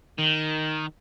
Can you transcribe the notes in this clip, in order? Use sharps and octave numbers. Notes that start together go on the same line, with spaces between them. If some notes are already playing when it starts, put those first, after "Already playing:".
D#3